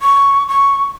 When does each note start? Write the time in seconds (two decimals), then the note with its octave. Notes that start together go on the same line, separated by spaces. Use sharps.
0.01 C#6
0.48 C#6